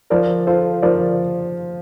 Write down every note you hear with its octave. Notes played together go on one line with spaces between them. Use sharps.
F3 A#4 D5
F4 A4 C5
F3 A#4 D5